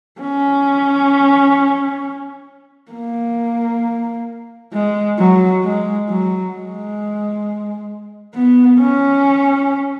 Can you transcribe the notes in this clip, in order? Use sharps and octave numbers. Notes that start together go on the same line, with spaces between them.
C#4
A#3
G#3
F#3
G#3
F#3
G#3
B3
C#4